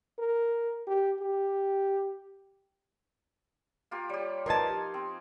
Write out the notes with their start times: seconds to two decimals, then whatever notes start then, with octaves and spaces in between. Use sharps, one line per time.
0.19 A#4
0.87 G4
1.21 G4
3.91 A#3 F4 G4
4.09 G3 G4 C#5
4.46 F3 D#4 A#4 B4 D#5 G#5 A5
4.69 G4
4.94 C4